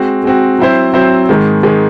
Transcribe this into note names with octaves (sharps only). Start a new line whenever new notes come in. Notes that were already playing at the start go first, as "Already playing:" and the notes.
Already playing: G#3 C4 F#4
G#3 C4 F#4
F#3 C4 E4 C5
F#3 C4 E4 C5
G#2 D#3 G#3
G#2 D#3 G#3